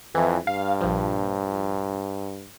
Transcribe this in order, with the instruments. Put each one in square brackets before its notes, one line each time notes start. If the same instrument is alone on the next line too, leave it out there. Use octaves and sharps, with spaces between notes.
[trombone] F2 [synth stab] E3
[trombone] G2 [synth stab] F5
[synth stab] A#1 F3